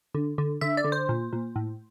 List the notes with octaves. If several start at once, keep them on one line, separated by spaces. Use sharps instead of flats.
D3
D3
D3 E5
D5
D3
C5
A#2
A#2
A2